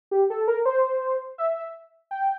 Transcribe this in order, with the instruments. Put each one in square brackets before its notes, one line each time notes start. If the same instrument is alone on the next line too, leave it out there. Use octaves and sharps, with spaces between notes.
[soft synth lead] G4
A4
A#4
C5
E5
G5